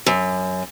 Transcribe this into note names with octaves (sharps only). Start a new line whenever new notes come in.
F#2